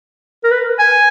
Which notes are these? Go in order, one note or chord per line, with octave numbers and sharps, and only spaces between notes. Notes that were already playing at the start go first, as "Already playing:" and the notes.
A#4
B4
G#5